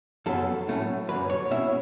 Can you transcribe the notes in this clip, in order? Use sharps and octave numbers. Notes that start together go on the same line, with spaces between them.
F#2 C#3 F#3 B3 A4
A2 F#3 A3 C#4 E4
F#2 D3 F#3 B4
C#5
B2 G#3 C#4 E4 E5